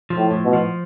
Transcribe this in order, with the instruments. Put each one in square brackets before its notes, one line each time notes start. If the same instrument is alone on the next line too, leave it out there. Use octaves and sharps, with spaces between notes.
[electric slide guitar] F3
[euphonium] A2
[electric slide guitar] A2
[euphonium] B2
[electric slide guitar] F3